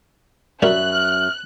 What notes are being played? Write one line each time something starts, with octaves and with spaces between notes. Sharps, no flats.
F#2 G3 F#4 A#4 E5 F#6
F6